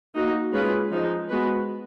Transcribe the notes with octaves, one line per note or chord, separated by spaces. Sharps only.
A#3 D#4 F#4
G#3 C#4 F4 G#4 B4
F3 G#3 D#4
G#3 B3 F#4 B4